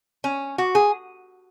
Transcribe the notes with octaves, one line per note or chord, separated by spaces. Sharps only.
C#4
F#4
G#4